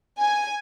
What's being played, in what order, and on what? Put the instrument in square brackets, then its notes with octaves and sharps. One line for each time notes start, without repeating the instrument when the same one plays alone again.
[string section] G#5